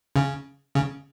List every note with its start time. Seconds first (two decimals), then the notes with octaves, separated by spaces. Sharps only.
0.16 C#3
0.75 C#3